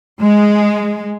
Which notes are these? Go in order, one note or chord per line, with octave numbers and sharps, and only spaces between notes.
G#3